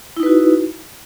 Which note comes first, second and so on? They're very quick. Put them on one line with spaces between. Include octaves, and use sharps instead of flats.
E4 D#4 B4 F#4